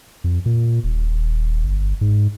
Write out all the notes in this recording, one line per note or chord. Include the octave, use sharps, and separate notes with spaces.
F2
A#2
D#1
G1
G#2